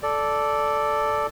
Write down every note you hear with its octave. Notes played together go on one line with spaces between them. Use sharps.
A4 D5